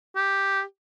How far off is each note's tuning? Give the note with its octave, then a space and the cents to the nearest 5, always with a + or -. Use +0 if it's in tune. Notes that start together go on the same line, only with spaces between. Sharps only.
G4 +0